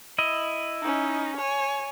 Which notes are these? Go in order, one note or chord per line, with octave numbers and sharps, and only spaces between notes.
E4 D#5
C#4 D#4
C#5 G#5